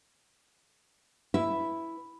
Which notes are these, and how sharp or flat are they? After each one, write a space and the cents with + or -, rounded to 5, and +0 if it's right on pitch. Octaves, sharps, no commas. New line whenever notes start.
E4 +0 B4 +0 E5 +0